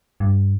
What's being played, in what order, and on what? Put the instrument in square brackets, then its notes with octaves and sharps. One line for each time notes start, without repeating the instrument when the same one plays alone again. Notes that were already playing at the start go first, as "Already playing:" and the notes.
[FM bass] G2